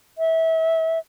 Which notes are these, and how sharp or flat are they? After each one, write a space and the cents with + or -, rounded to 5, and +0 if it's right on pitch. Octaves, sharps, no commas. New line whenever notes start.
E5 -25